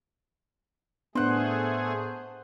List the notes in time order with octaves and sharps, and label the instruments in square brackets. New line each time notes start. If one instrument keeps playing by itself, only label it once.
[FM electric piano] A2 D4 [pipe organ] A3 G#4 [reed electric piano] B3 [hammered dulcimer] C5 F#5